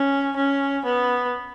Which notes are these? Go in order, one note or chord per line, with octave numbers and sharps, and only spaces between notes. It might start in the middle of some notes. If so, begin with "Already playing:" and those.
Already playing: C#4
C#4
B3